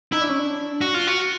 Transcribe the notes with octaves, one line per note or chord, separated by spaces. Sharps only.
D#4 E4
D4
C#4
D4
F#4
F4
F#4